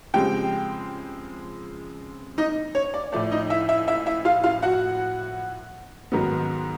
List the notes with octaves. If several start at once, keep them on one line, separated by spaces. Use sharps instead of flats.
C#3 F3 G#3 C4 G4 G5
D#4 D#5
C#5
D5
A2 F3 A3 D5
D#4 D#5
E4 E5
E4 E5
E4 E5
E4 E5
F4 F5
F4 F5
F#4 F#5
G#2 D#3 F#3 B3